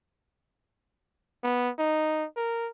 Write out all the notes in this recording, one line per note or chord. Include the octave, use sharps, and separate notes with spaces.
B3
D#4
A#4